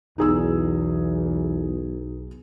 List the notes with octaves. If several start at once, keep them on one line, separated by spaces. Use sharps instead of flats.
B1 E2 D#4 G#4 E6